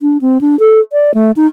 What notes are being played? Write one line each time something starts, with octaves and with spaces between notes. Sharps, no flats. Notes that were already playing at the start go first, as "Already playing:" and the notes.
D4
C4
D4
A4
D5
A3
D#4